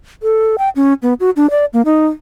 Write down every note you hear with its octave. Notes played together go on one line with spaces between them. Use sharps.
A4
G5
C#4
B3
F#4
D4
D5
A#3
D#4